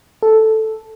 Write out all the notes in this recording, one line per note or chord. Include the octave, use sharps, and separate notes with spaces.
A4